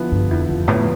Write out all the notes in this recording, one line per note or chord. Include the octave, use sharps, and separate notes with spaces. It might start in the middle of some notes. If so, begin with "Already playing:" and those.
Already playing: D3 F3 B3 E4
G2 D3
F2 E4
F2 F3
A2 B3